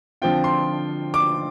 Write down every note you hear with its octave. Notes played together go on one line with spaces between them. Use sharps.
D3 F3 C4 F4 G5
C6
D6